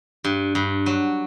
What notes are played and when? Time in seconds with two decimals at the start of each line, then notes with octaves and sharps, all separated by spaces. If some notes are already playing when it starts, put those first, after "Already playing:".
0.24 G2
0.55 G2
0.86 F#3